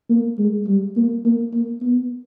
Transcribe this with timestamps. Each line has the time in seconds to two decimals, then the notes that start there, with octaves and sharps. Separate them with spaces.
0.10 A#3
0.39 G#3
0.67 G3
0.96 A#3
1.25 A#3
1.53 A#3
1.82 B3